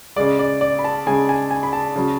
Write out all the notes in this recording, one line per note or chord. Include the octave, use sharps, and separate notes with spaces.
C#3 G#3 D5
D5
D5
B5
A5
C#3 G#3 G#5
G#5
G#5
B5
A5
C#3 F#3